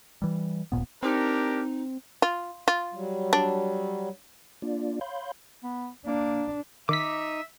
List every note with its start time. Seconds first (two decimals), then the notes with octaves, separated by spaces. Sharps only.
0.22 E3 G3
0.72 D#1 A#1 A#2 B3
1.03 C4 D4 D#4 G4 A#4
2.22 F4
2.68 F4
2.94 F#3 G3
3.33 D4
4.62 A#3 D4 F4 D5
5.01 C#5 F5 B5 C6 G6
5.63 B3
6.06 A#3 D4
6.89 D#3 D#4 E5 D6 B6